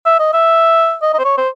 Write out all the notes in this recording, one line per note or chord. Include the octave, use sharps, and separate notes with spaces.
E5
D#5
E5
D#5
D#5
C5
C#5
C5